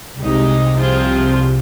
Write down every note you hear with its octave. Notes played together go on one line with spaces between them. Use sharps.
C2 C3 G#3 D#4 G4
F3 C4 F4 G#4 C5